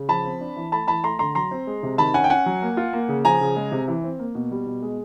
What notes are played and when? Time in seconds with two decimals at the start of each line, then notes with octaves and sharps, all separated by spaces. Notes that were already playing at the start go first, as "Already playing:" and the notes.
Already playing: C#3
0.09 F3 A5 B5
0.25 C4
0.40 D4
0.57 E3
0.72 A3 A5 B5
0.88 E3 A5 B5
1.04 A3 A#5 C6
1.19 D3 A#5 C6
1.35 F#3 A#5 C6
1.51 C4
1.67 G#3
1.83 C3
1.98 D#3 A5 B5
2.14 C#4 F#5 G#5
2.24 G5
2.30 C#4 F#5 G#5
2.46 F#3
2.62 A#3
2.77 F4
2.93 A#3
3.09 C#3
3.25 F3 G#5 A#5
3.41 C#3
3.56 G#3
3.72 C3
3.88 E3
4.04 C4
4.19 A#3
4.35 B2
4.51 G3
4.66 B2
4.82 G#3